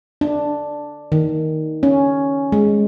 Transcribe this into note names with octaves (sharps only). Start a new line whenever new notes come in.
D4
D#3
C#4
G#3